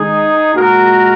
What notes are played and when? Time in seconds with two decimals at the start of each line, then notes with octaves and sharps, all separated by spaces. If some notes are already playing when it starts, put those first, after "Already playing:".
Already playing: D#3 G#3 D#4 G#4
0.55 A#2 G#3 F#4 A#4